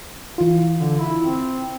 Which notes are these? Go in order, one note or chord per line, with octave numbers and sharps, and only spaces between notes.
E3 F4
D3
E4
C4